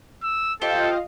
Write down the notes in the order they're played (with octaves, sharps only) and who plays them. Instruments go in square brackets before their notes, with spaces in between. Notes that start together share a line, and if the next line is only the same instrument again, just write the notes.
[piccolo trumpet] E6
[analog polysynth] F4 D#5 F5 [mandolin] G4 C5 [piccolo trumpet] A4